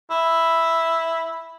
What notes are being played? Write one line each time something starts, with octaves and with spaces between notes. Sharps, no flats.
E4